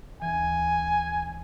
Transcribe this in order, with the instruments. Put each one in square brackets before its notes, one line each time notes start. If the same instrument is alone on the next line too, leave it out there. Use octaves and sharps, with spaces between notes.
[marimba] D2 E3 [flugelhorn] G#5